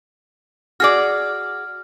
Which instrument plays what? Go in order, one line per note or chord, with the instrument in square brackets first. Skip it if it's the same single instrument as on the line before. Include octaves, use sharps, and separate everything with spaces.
[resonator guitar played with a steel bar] F#4 G#4 D5 [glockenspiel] F6